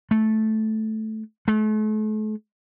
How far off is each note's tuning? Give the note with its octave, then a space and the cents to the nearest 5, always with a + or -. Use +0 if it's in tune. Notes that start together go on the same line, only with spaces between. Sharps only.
A3 -10
A3 -40